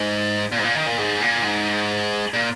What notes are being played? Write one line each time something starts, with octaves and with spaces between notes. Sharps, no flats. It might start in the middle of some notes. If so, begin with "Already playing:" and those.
Already playing: G#2
A#2
G#2
A#2
D#3
A#2
G#2
A#2
G#2
A#2